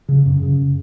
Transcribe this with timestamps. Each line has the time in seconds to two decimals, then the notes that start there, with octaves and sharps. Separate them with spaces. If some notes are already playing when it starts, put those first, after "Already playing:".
0.09 C#3
0.26 F#2
0.43 C#3